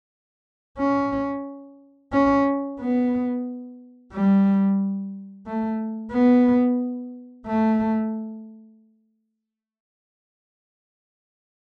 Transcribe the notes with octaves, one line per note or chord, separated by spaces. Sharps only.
C#4
C#4
B3
G3
A3
B3
A3